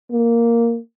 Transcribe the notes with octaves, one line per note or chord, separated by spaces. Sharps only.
A#3